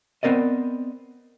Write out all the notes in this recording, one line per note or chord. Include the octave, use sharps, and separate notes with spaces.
B3 C4 A#4 D5 D#5